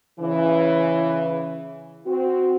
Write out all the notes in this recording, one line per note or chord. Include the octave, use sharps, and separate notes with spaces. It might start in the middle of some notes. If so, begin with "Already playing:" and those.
C#3 E3
C4 F#4